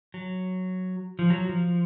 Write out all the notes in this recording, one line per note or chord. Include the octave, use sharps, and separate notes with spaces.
F#3
F3
F#3
F3